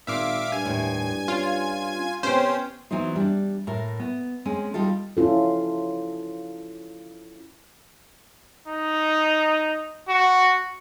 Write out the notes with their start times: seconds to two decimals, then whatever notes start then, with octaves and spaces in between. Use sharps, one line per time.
0.07 G#1 A#2 E5 F5 D6
0.52 G2 G#5 G#6
0.65 D#2 A2
1.28 C#4 F4
2.23 C3 B3 C#4 C5 G5
2.91 E3 F#3 B3 D#4 C5
3.16 G3 D4
3.67 A2 A#4
4.00 B3
4.45 G#3 C4 C#4
4.74 G3 D#4 F4 A4
5.17 C#4 E4 F4 A4
8.68 D#4
10.09 F#4